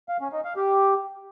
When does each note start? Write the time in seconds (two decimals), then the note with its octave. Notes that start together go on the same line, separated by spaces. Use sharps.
0.09 F5
0.21 C#4
0.33 D#4
0.45 F5
0.57 G4